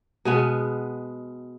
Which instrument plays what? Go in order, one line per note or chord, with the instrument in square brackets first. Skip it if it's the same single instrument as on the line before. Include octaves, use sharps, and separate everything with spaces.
[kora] B2 G#3 B3